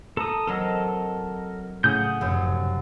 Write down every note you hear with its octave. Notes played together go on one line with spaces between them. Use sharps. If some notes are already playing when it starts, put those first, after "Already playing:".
A4 A#5 D#6 E6
F#3 C4 A4 A#4 D#5
A2 C#3 F#5 G#5 D#6 G6
F1 F#2